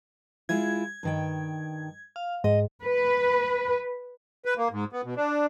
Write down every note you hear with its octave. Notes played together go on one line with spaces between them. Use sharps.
G#3 E4 F4 G#6
G2 D#3 G5
F5
G#2 D#5
B4
B4
A#3
G#2
B3
B2
D4